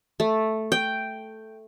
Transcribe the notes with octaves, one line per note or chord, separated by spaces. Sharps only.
A3
G5